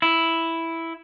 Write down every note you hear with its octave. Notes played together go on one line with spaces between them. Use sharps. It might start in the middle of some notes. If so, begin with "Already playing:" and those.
E4